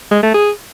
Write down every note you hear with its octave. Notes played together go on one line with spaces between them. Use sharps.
G#3
A3
G#4